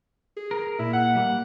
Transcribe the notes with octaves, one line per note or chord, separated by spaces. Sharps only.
G#4
A#4
A#2 E4
F#5
G3 A#3